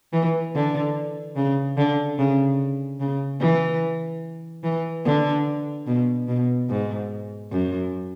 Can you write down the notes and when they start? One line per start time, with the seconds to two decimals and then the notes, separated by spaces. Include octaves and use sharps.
0.13 E3
0.55 D3
1.36 C#3
1.77 D3
2.19 C#3
3.00 C#3
3.41 E3
4.64 E3
5.05 D3
5.87 B2
6.28 B2
6.69 G#2
7.51 F#2